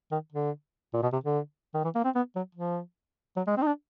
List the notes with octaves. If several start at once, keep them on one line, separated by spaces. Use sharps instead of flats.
D#3
D3
A#2
B2
C3
D3
D#3
E3
A#3
C4
B3
F#3
F3
F#3
G#3
C4
D#4
D4